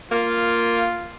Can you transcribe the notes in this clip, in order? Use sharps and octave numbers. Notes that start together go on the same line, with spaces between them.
A#3 F4